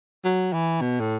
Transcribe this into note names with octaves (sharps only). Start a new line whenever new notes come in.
F#3
E3
B2
A2